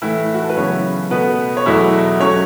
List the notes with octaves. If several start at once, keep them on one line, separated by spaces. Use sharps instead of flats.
A2 E3 A3 E4 E5
F#4
A4
B4
F#2 C#3 E3 B3 C#4 C#5
B2 A3 B3 B4
C#5
E2 B2 F#3 A3 E4 E5
F#3 A3 C#4 C#5